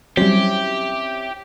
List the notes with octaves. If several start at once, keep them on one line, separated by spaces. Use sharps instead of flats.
F#3 G3 C4 C#4 E4 G4